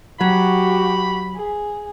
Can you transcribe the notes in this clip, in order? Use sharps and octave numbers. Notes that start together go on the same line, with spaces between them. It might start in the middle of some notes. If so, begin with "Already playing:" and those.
F#3 F#4 G4 B5
G#4